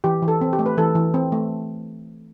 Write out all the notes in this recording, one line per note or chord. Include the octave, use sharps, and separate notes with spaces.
E3 G4
E3
A4
C4
G4
A3
B4
E3 A4
E3
C4
A3